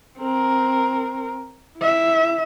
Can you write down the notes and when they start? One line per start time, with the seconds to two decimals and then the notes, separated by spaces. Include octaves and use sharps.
0.18 C4 A#4
1.78 E4 E5